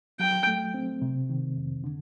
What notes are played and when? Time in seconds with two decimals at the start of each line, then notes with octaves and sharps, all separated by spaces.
0.20 F#3 G5
0.47 A3
0.74 C4
1.02 C3
1.30 D#3
1.57 F2
1.84 D3